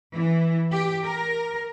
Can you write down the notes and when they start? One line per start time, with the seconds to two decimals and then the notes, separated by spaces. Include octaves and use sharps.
0.14 E3
0.71 G4
1.04 A#4